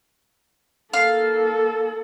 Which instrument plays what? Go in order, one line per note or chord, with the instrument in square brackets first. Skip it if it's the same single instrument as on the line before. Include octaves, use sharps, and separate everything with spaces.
[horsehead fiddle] A#3 A4 [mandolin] F5